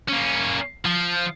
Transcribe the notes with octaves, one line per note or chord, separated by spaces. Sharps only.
A#3 C#4
F3